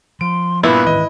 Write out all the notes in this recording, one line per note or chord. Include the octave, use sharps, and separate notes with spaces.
F3 C6 D7
G2 A#2 B3 E4 B4
G#2 D#3 E3 D#5